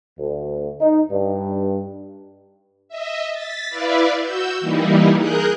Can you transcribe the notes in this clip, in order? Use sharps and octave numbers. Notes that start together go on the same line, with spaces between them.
D2
D#4
G2
D#5 E5
A6 B6
E4 B4 D5 E5 F5
F#4 E6 G6
E3 G3 A#3 D#4 E4
G#4 A#4 F#6 G6